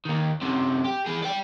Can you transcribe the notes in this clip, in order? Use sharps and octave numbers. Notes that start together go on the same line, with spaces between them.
D#2 D#3
F#2 C3
G4
E3 G#4
D5 G5